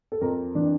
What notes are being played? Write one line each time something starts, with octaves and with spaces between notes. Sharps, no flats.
A4
F2 A#4
E3 D4